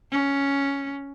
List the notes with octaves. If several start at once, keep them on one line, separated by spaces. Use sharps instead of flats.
C#4